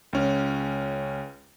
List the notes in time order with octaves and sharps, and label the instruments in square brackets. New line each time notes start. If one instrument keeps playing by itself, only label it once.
[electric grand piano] C#2 C#4